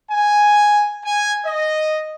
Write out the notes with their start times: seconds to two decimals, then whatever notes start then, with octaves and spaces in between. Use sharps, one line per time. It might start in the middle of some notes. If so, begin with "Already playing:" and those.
0.11 G#5
1.03 G#5
1.45 D#5